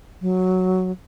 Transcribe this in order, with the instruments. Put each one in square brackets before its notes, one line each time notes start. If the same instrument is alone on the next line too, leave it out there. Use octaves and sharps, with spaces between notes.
[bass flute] F#3